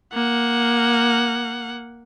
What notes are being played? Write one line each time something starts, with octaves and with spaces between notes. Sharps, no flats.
A#3 F#5